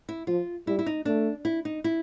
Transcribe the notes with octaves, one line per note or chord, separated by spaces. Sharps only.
E4
F3 F4
G3 E4
E4
D#4
A3 D4
E4
D#4
E4